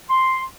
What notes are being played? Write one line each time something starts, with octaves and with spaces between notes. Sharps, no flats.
C6